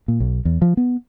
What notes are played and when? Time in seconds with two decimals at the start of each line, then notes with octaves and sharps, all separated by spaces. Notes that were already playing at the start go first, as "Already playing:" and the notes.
0.08 A#2
0.20 B1
0.45 E2
0.62 F3
0.77 B3